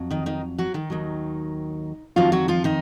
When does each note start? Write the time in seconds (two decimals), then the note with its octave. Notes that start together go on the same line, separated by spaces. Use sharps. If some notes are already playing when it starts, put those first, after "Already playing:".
Already playing: F2 F#3
0.11 D#3 D#4
0.26 D#3 D#4
0.58 F#3 F#4
0.74 D#3 D#4
0.90 D#2 D#3 F#3
2.16 F2 D#3 F3 F#3 F4
2.32 F#3 F#4
2.48 F3 F4
2.64 D#3 D#4